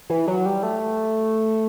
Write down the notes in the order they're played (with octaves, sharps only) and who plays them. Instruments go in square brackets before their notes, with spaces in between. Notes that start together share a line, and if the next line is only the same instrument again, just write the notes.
[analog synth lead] E3
F#3
G3
A3